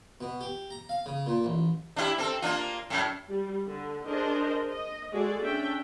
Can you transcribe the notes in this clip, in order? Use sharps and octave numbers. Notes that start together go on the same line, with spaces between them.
B2
G4
A#5
F5
C#3
A#2
A1
D4 E4 G4
C4 A4
A#3 D4 F4
F#2 A2
G3
D3
D4 G#4 A#4 C5 D#5
D#5
G#3 F#4 G#4 A4 D5
C#4 D4 E5 G5